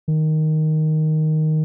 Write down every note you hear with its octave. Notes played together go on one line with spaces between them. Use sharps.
D#3